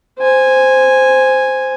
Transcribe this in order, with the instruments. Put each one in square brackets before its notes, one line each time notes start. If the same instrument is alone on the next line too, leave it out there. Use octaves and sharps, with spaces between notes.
[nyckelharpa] C5 G#5